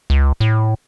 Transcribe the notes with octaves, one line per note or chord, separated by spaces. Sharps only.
C#2
A2